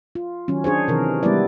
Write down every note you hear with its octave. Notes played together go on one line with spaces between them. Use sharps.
F4
D#3 F#3 C#4
D4 G#4 C5 C#5
C3 D#3 E3 A#4
G3 G#3 B3 E4 B4 D5